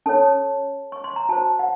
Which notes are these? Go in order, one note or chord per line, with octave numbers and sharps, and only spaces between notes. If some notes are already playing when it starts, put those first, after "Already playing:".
C#4 A4 C#5 A5
C#6
C6
A#5
F#4 C5 A5
F#5